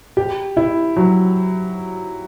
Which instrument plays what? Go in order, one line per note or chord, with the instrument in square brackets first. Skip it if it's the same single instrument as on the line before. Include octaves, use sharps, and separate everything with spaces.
[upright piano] G4
E4
F#3